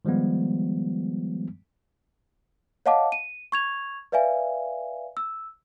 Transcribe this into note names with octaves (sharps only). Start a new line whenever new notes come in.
D#3 F3 G3 G#3 B3
C#5 D#5 F5 F#5 A5 D6
D#7
C#6 G#6 F7
B4 D5 E5 F5 G#5
E6